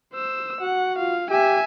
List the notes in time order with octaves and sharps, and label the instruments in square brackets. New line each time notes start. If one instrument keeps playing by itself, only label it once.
[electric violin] C5 E6
[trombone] F#4 [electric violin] F#5
[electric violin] F4 F5
[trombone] G4 [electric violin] E5 G#5